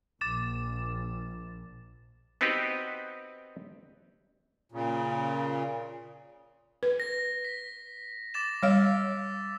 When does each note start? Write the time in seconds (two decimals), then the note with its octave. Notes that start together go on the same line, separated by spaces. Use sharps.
0.21 A#1 D6 A6 E7
2.41 B3 C4 D#4 F#4 G4 B4
4.72 A#2 C#3
6.83 B4
7.00 A#6
7.45 B6
8.34 D6 A6 E7
8.63 G3 C#5 F5 D6 E6